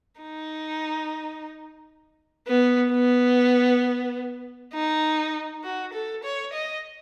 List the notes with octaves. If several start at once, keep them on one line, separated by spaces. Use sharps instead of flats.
D#4
B3
B3
D#4
F#4
A4
C#5
D#5